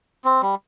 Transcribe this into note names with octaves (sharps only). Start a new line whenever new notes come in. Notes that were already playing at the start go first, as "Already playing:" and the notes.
C4
G3